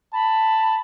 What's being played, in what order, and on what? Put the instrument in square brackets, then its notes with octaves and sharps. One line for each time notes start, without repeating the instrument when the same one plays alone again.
[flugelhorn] A5 [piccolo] B5